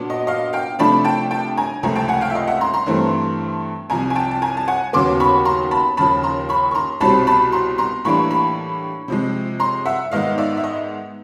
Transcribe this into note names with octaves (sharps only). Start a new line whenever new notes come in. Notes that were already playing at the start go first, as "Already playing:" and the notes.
Already playing: A#2 F#3 B3 D4
D#5
D#5 F5
F5 G5
C3 F3 A3 D4 A5 B5
G5 A5
G5 A5
G#5 A#5
C#2 C3 F3 A3 C4 G#5 A#5
G5 A5
F#5 G#5
F5 G5
E5
D#5 F5
E5 F#5
A#5 C6
A#5 C6
G2 E3 A3 C4
C2 C3 F3 G#5 A#5
G#5
G5 A5
A5
G#5 A#5
A5
F#5 G#5
D#2 C#3 F#3 B3 C6 D6
B5 C#6
A#5 C6
A5 B5
D#2 C#3 F3 A5 B5
A#5 C6
B5 C#6
C#6
A#5 C6
C2 B2 G3 C4 A5 B5
A5 B5
A#5 C6
A#5 C6
A2 E3 G3 A#3 D4 B5 C#6
B5 C#6
C3 F3 G#3
A#5 C6
E5 F#5
G#2 D#3 G#3 B3 D#4 D#5 F5
D5 E5
E5
D#5